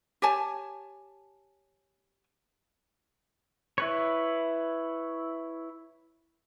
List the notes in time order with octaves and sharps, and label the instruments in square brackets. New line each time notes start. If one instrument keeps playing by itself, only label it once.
[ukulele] G4 C#5 G#5 A5
[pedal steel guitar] E4 B4 C#5